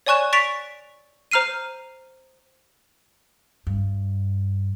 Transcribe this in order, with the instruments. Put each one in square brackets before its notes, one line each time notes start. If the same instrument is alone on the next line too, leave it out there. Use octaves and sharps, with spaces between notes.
[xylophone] C#5 D5 G#5 C#6 F#6 E7
C#6 A6 B6 D7 F7
C5 A#5 F6 C7 D#7
[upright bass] G2